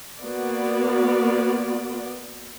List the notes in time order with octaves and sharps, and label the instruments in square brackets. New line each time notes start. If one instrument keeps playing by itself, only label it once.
[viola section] A#3 B3 F#4 D5